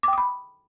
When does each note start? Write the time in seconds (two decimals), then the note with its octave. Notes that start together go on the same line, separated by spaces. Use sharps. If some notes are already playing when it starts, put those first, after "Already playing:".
0.03 D6
0.08 G5
0.13 D#6
0.18 B5